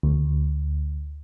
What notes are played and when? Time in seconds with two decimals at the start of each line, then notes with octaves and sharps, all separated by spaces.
0.03 D2